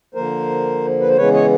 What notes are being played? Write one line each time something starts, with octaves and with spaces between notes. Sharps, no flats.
D3 F3 A#3 A#4 C5
B4
C5
C#3 E3 G#3 B3 B4 C#5
C#5 D#5